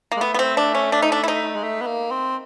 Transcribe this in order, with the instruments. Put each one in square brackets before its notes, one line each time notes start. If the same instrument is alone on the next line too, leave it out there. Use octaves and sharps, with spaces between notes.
[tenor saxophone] G#3 [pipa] A#3
[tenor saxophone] A3 [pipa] B3
[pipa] B3
C4
D4
C#4
D4
D#4
D4
E4
D#4
[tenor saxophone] G#3
A3
B3
A#3
C4